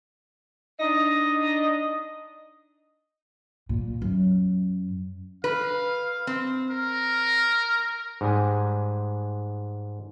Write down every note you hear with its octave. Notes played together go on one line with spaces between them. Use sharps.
D4 D#4 D#5
A#2
F#2
B4 F5
C4
A#4
G#2 G3 G#3 G#5